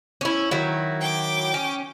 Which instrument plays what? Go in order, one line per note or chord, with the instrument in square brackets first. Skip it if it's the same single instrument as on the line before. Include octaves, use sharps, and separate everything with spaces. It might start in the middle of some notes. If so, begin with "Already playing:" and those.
[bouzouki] C#4 E4
D#3 F#3 E4
[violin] G5 D6
[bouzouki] C#4